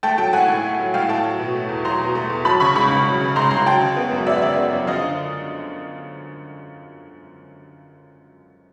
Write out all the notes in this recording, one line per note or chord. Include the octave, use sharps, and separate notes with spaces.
A3 G5 A5
F#3 G5 A5
A2 F#5 G#5
A2
A3
F#3
A2 F5 G5
A2 G5 A5
F#3
B2
A3
E2
F#3 A#5 C6
B2
A3
E2
F#3 A5 B5
C#3 B5 C#6
C#2 B5 C#6
C#2
F#3
C#3
C#2 A#5 C6
C#2 A#5 C6
F#3 G5 A5
C#3
B3
F#2
F#3 D5 E5
C#3 D5 E5
B3
F#2
F3 D#5 F5
D3